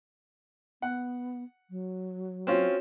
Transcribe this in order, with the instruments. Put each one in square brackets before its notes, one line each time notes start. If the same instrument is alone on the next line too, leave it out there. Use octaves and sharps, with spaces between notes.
[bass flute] B3 [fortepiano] F#5
[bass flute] F#3
[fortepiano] C4 C#4 F4 [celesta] F#4 C#5 E7